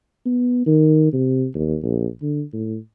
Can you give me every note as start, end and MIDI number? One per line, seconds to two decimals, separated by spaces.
0.26 0.66 59
0.66 1.08 51
1.13 1.46 48
1.55 1.77 39
1.83 2.07 34
2.22 2.43 50
2.53 2.77 45